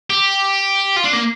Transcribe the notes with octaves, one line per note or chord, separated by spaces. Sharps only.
G4
F4
D4
A#3